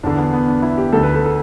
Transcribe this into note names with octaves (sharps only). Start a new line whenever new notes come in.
E2 D3 D4
B3
B3
D4
E4
G4
D2 D3 A4
B4
A4
A4